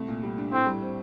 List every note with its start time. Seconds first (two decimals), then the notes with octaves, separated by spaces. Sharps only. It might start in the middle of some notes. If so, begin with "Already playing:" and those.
Already playing: C2 A3
0.08 A#2
0.23 G3
0.38 D4
0.52 A2 C4
0.66 G3
0.81 C4